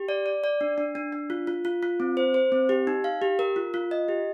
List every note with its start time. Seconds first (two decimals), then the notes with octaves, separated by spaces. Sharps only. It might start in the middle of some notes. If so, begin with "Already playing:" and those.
Already playing: G4
0.08 D5
0.26 D5
0.44 D5
0.61 D4
0.78 D4
0.95 D4
1.12 D4
1.30 F4
1.47 F4
1.65 F4
1.83 F4
2.00 C4
2.17 C5
2.34 C5
2.52 C4
2.69 G4
2.87 D#4
3.04 F5
3.22 G4
3.39 A#4
3.56 F4
3.74 F4
3.91 D#5
4.08 G4